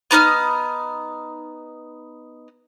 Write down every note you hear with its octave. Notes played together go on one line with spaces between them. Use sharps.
B3 D#4 D#6 F6